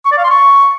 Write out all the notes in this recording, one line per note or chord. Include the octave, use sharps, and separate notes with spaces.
C#6
D5
F5
C6
C#6